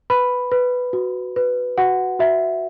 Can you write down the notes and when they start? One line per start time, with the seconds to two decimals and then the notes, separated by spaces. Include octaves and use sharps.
0.10 B4 B5
0.52 B4
0.93 F#4
1.36 B4
1.78 F#4 F#5
2.19 F#4 E5